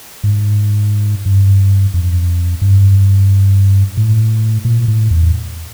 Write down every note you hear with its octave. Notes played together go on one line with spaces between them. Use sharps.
G#2
G2
F2
G2
A2
A#2
A2
E2